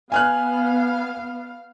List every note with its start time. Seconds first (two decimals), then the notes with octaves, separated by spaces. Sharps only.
0.12 B3 F5 G#5 F6 F#6